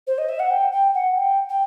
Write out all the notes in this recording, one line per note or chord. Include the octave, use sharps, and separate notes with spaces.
C5
D#5
E5
F#5
G5
G5
F#5
G5
G5